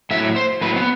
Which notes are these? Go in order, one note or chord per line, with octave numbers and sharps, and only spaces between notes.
A2 F#3 E5
C5
A2 F#3 B4
B3